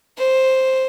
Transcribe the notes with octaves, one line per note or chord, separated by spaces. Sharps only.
C5